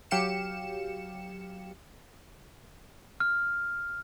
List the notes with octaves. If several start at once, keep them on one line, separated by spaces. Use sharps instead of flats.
F#3 G4 F5 C#7 E7
F6